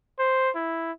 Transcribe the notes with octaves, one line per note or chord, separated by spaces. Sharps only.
C5
E4